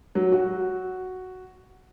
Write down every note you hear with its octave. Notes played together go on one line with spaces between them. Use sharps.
F#3
F#4